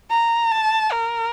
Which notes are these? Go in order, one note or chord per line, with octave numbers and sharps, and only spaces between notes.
A#5
A5
A#4